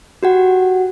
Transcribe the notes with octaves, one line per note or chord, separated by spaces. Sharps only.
F#4 G4 F#5